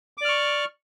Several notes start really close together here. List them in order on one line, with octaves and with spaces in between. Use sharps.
D6 D5 F6 C#6